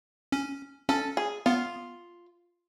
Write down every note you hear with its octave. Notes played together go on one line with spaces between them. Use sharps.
C#4
C#4 A4
G#4
B3 F4